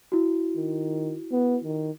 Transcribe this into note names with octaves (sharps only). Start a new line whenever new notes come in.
E4 F#4
D#3
B3
D#3